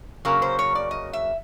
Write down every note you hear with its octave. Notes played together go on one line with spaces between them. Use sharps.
C#3 F#3 A#3
C5
C#5
D5
D#5
E5